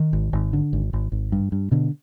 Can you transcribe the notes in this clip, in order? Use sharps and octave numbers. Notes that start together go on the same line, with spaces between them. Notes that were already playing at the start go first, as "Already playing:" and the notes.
Already playing: D#3
G#1
G#1
D3
G#1
G#1
G#1
G2
G2
B2 D3